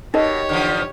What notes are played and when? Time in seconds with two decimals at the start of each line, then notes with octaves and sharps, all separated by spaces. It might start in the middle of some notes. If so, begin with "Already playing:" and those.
0.14 B2 D#4 G4 A#4 C#5 D#5
0.49 D3 E3 F3